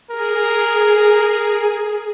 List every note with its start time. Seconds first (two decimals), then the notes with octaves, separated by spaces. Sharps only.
0.11 G#4 A#4